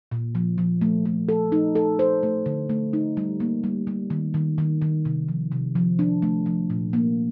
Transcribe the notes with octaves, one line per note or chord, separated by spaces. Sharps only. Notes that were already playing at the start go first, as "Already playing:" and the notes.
A#2
F3
F3
A3
A3
A4
D#4
A4
C5
A3
D3
A3
D#4
G3
A#3
G3
G3
D#3
D#3
D#3
D#3
C3
F3
C3
F3
D4
A3
F3
A#2
A#3